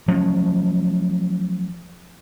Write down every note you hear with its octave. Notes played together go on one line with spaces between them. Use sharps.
F3 F#3 A3 C#4